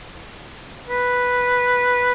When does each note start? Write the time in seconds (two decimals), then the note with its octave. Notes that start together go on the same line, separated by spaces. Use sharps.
0.88 B4